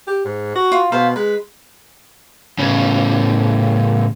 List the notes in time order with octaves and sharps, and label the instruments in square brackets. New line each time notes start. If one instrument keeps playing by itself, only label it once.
[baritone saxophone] G4
G#2
F#4
[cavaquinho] F4
[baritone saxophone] B2 [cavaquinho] C5 F5 B5
[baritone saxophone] G#3 [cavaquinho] B4
[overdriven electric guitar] A2 C#3